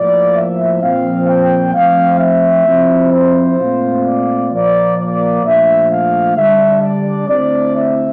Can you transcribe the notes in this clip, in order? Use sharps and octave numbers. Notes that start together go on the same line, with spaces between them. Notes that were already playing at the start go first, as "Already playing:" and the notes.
Already playing: A2 F3 A#3 D5
E5
A#2 F3 C4 F5
G5
F3 A3 C4 F5
E5
F3 C4 E4
C5
A#2 A3 C4 F4
D5
A#2 F3 A#3 D5
D5
A#2 F3 A3 D4 F4 E5
F5
D3 G3 D4 E5
D5
D3 A3 C4 E4 D5
E5